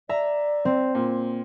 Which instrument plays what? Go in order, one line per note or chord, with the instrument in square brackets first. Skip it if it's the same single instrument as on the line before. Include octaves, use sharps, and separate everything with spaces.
[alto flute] D5 [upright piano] E5 [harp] A#5
[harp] C4
[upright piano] A#2